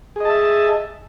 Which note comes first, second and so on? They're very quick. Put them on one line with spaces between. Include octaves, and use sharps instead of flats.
G#4 D#5 A5 E5